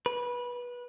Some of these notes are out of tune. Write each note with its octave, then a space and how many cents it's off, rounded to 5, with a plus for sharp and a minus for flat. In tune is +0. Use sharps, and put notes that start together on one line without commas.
B4 -20